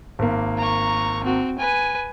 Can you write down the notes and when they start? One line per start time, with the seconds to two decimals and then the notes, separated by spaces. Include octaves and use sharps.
0.19 G#1 A#3
0.58 A#5 C#6
1.24 C4 F#4
1.58 B4 G#5